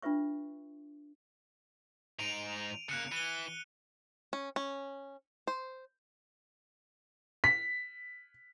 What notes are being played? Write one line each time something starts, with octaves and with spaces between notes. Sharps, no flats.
D4 F4 B4 E5 C#6
G#2 D#4 D7 D#7 F7
C#3 A#3 F#6 C#7
E3 D#7 G7
C#4
C#4
C5
B6